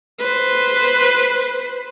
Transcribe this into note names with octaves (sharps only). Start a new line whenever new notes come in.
B4 C5